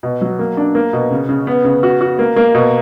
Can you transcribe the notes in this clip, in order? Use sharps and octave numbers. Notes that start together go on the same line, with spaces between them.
B2
F#3
A#3
D4
A#3
B2
C#3
C#3
B3
C#3
F#4
F#4
A#3
A#3
B2